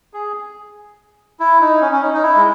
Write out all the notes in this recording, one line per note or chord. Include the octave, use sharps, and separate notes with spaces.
G#4
E4
D#4
C#4
C#4
D#4
D#4
E4
G#3